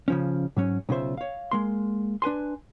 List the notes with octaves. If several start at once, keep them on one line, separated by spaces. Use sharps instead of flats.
C#3 F3 C#4
G#2 F#3 C#4
B1 C#3 F4 C5 E5
C#5 F5
G#3 A#3 C6
D4 B4 G#5 C6